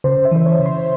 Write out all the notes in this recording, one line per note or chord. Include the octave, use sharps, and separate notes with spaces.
C#3 C5
E5
E3 C5
C#5
C#3
C6